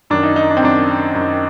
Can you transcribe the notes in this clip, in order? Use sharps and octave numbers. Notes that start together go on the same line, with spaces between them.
F#2 D#3 D4
D#4
D#4
D4
C4
F#2 D#3 D4
F#2 D#3